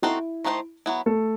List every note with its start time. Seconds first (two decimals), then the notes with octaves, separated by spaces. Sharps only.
0.02 C4 D#4 E4 F#4 A4 C5
0.44 D#3 A3 D#4 F#4 C5
0.86 F#3 B3 E4
1.06 A3 A4